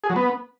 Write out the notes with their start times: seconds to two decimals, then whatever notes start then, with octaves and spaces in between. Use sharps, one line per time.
0.04 G#4
0.10 F#3
0.16 B3